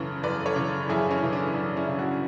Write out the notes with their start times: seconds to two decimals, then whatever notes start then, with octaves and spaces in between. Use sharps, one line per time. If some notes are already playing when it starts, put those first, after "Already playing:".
Already playing: F#2 C#3 E3 A4 C#5
0.23 F#2 B4 D5
0.46 A4 C#5
0.56 C#3 E3
0.89 F#2 E4 G#4
1.11 C#4 E4
1.22 C#3 E3
1.33 D4
1.54 F#2 D4
1.77 C#4 E4
1.88 C#3 E3
1.99 D4 F#4